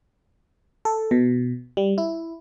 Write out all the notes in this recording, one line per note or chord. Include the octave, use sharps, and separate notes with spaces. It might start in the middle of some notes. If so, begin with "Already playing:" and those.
A4
B2
G3
E4